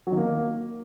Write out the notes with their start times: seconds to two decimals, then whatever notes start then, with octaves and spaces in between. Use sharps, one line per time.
0.07 F#3
0.12 D#3
0.17 A#3